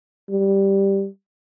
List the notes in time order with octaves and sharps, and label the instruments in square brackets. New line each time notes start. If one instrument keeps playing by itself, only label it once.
[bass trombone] G3